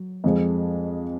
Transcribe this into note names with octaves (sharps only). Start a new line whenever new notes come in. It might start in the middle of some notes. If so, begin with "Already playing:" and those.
Already playing: F#3
F2 F3 G#3